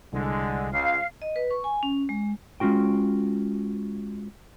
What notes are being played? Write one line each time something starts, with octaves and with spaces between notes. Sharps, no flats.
C2 D3 G#3
C#2 F5
D#5
B4
C#6
G#5
C#4
G#3
G#3 C#4 F4 F#4 G5